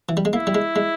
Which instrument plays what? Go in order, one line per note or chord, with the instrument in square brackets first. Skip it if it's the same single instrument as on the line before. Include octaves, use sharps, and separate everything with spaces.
[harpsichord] E3
G3
G#3
[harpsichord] A#3 [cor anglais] E4
[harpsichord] G3
G#3
G#3